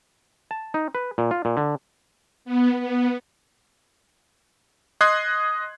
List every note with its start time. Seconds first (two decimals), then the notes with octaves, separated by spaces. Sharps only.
0.51 A5
0.74 D#4
0.95 B4
1.18 A#2
1.31 F4
1.45 A#2
1.57 D3
2.45 B3
2.80 B3
5.01 D#5 C6 D#6 F#6 G#6 C7